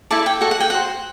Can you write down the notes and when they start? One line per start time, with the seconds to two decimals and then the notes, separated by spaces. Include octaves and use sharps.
0.11 E4 A4 D5 A5
0.26 G5
0.41 F#4 A4 D5 F#5
0.51 F#5
0.60 G5
0.70 F#4 C5 F#5